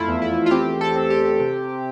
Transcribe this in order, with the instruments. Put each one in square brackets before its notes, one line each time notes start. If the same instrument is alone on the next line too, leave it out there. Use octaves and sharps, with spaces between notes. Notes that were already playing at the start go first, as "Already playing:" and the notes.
Already playing: [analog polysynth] F2 A3 E4 F4
E2
E4
F4
C4 G4
A4
C4
G4
C3